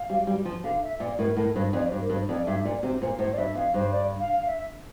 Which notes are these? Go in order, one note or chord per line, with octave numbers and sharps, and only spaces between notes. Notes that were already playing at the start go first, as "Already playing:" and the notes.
Already playing: F5
G3
G3
F3
D3 F5
E5
A#2 D5
A2 A#4
A2 A#4
G2 C5
F2 D5
C5
G2
A#4
G2
C5
F2 D5
G2 E5
A#2 D5
C3 C5
A#2 C5
A2 C5
D5
G2 E5
F2 F5
G2 C5
D5
F5
F5
E5